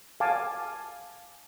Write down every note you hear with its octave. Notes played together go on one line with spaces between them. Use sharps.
F5 G#5 A5 D6